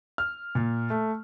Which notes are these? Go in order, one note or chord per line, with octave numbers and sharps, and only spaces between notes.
F6
A#2
A3